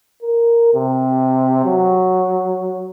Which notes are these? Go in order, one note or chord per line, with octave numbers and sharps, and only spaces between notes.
A#4
C3
F#3